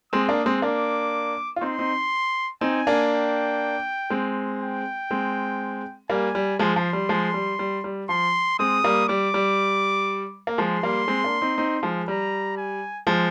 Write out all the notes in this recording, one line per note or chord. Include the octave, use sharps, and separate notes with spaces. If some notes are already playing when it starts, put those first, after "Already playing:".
G#3 C4 D#6
A#3 D4
G#3 C4
A#3 D4 D6
F4
C4 D#4 C6
C4 D#4
C4 D#4 G#5
A#3 D4
G5
G#3 C4
G5
G#3 C4
G3 A#3 G#5
G3
F3 G#3 C6
F3
G3
F3 G#3
G3
G3
G3
F3 C6
G#3 C4 D#6
G3 A#3
G3 D6
G3
A#3
F3 G#3 C6
G3 A#3
G#3 C4
A#3 D4
C4 D#4
C4 D#4
F3 G#3
G3 A#5
G#5
F3 G#3